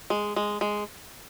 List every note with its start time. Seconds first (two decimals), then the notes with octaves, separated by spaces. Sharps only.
0.10 G#3
0.36 G#3
0.61 G#3